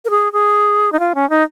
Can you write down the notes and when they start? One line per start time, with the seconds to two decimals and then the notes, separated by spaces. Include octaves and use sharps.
0.05 A#4
0.10 G#4
0.33 G#4
0.92 D#4
0.99 F4
1.15 C#4
1.30 D#4